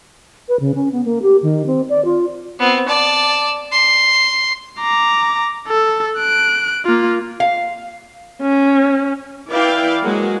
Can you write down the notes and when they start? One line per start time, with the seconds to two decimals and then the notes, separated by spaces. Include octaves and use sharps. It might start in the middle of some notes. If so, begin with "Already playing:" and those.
0.49 B4
0.60 C#3
0.75 C#4
0.92 B3
1.05 A#3
1.22 G4
1.43 D#3
1.66 C4
1.89 D5
2.05 F4
2.59 B3 C4
2.88 D5 A5
3.72 C6
4.79 A#5 D6
5.68 A4
6.18 F#6 D7
6.85 A#3 F4
7.40 F5
8.42 C#4
9.49 E3 E4 B4 D5 F5 G5
10.02 F#3 G#3 A#3 F#4 G#4